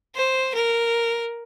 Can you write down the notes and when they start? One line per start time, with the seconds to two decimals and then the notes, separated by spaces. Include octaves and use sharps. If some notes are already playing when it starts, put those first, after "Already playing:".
0.15 C5
0.54 A#4